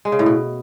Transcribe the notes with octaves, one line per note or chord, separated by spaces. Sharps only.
G#3
C#3
A2
B2